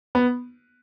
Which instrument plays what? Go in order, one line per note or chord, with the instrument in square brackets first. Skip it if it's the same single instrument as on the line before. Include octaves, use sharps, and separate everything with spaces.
[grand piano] B3